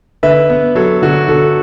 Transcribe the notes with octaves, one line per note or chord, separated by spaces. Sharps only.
D3 B4 E5
B3
F#3 A4
D3 F#4
D3 A4